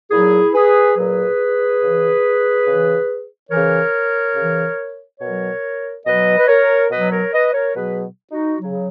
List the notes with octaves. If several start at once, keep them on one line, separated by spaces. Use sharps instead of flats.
A#2 F#3 E4 G#4
G#4 B4
A#2 F#3 G#4 B4
C#3 E3
C#3 E3
C#3 E3 A#4 C#5
C#3 E3
B2 F#3 A#4 C#5
B2 F#3 B4 D#5
B4
A#4 C#5
B2 F#3 B4 D#5
A#4 C#5
B4 D#5
A#4 C#5
B2 F#3 G#4 B4
D#4 F#4
C#3 F#3